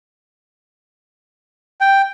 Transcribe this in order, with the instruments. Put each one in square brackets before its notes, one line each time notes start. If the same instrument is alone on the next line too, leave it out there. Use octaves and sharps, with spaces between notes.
[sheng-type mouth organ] G5